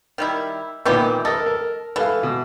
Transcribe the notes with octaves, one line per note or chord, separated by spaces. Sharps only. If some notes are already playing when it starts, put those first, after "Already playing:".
D#3 G3 E4
A#2 D#3 E3 B3 G4
A4 A#4 D#5
A#4
E3 A4 F5
B2